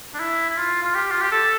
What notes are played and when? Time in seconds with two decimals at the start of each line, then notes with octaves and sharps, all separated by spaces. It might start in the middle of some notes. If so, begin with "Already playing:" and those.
0.14 D4
0.20 E4
0.49 E4
0.57 F4
0.82 F4
0.95 G4
1.11 F4
1.21 G4
1.32 A4